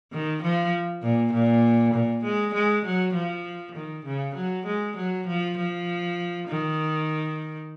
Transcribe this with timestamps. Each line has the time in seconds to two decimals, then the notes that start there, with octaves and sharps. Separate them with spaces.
0.12 D#3
0.42 F3
1.02 A#2
1.33 A#2
1.93 A#2
2.24 G#3
2.54 G#3
2.85 F#3
3.14 F3
3.75 D#3
4.05 C#3
4.35 F#3
4.66 G#3
4.97 F#3
5.27 F3
5.57 F3
6.48 D#3